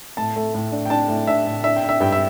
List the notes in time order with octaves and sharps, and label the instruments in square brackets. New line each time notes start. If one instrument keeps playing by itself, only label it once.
[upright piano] A2 A5
A3
A2
D4
G5
D4 A5
A2
D4 E5
A2
D4 E5
G5
D4
E5
G2 G5
E5